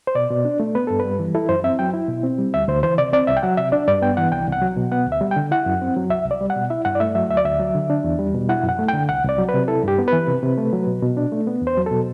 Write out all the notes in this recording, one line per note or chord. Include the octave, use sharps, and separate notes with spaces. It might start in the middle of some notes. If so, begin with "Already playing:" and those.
C5
B2 D5
B2
D4
A3
B3 B4
G2 A4
B4
G3
E3
E4 A4
F#2 C5
C4 E5
F#3 G5
E4
B2
C4
G3
D2 E5
D2 C5
E3 C5
C3 D5
C4 D5
C2 E5
G5
F#3 F#5
C3 E5
D4 D5
G2 D5
B3 G5
E3 F#5
C2 G5
C2
F#5
F#3
B2
B3 F#5
D2
E5
G3
G5
D3
E4 F#5
F#2
C4
F#3
C2 E5
C2
D5
G3
F#5
B2
E4 E5
G2 F#5
D5
A3 E5
F#3 E5
D2 E5
D5
D2 E5
F#3
D3
D4
E2
G3
B2
E4 F#5
F#2
F#5
A3
G5
D3
C2 F#5
C2
D5
F#3
B4
C3
E4 A4
G2 G4
B3
E3 B4
C3
C3
A3
F#3
B2
B2
D4
A3
B3
E2
C5
F#3
B2 A4